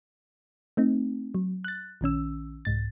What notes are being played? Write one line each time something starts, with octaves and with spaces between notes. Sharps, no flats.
A3 C4 D#4
F#3
F#6 A6
A#1 D#3 C#4 E6
C2 G#2 A6